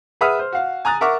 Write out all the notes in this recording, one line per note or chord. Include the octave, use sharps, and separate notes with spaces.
G#4 B4 E5 F#5 D#6 F6
C5
F#4 F5
G#5 A#5 D#6 F#6 A6
A#4 E5 F#5 C#6 D6